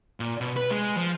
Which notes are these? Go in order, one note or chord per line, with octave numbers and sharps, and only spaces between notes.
A#2
B2
B4
G#3
F3